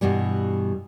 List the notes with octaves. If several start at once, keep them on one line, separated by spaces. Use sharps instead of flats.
G2 B2 E3 G3